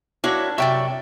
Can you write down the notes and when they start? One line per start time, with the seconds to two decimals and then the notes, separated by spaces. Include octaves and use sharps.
0.24 A#3 D4 E4 F#4 C#5
0.58 F#2 C3 D5 E5 G5 C#6